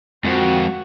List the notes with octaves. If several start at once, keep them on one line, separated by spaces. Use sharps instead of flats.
F2 G#3 F#4 A#4 C5